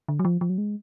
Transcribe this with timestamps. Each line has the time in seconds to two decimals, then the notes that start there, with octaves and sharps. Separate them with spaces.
0.08 D3
0.19 F#3
0.25 F3
0.41 F3
0.49 F#3
0.58 G#3